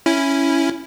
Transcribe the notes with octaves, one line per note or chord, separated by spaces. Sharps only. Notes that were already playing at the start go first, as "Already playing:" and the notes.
C#4 E4